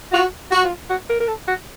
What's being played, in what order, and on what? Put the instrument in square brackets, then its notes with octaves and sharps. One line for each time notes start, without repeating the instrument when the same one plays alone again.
[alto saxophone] F4 [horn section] F#4
[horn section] F#4
[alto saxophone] F4
F#4
A#4
A#4
A4
F#4